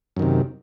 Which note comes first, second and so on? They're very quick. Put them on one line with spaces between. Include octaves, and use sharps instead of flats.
F#2 D#3 C3